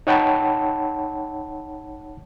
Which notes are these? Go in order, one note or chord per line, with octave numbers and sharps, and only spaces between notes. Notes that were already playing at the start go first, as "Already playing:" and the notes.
D#4 C#5 F#5 G5 A5 B5